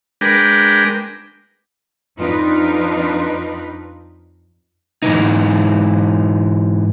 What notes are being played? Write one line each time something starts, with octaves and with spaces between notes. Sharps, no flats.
G#3 D4 A#4 B4 G5
F2 D4 D#4 F4 B4
G#2 C#3 E3 D#4